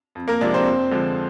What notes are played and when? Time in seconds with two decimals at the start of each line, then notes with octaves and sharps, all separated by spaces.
0.15 F2
0.28 A#3 A#4
0.41 C3 F3 G#3 D4 D5
0.54 C4 C5
0.66 F2
0.91 D3 F3 G#3